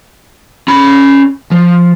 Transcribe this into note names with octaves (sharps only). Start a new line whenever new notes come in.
C#4 B5
F3